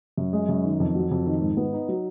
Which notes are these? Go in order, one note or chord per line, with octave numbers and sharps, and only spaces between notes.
F#2
G#3
F#2
D#3
F2
F#3
F2
D#3
G#2
B3
D#4
F#3